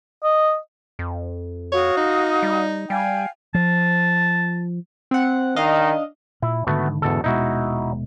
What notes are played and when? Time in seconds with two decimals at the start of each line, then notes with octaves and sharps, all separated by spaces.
0.24 D#5
0.99 F2
1.72 F#4 C#5 F5 D#6
1.97 D#4
2.43 G3
2.90 G3 F5 G5 G#5
3.55 F3 A5
5.11 C4 F#5
5.56 D#3 D4 D#5 F5
6.42 A#2 E4
6.67 G#2 D3 D#3 A3 B3 F#4
7.02 E2 G#2 B2 D3 A4
7.24 D#1 B2 G#3 D#4 E4 F#4